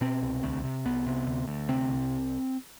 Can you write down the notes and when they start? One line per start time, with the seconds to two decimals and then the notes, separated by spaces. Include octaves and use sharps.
0.01 B2 C4
0.22 C2
0.43 D2
0.64 C3
0.85 C2 B3
1.07 C3
1.27 D2
1.48 D2
1.69 C3 C4
1.89 C2